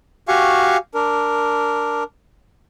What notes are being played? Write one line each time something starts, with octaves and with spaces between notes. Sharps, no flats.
F#4 G4 F5 G#5 C#6
D4 A#4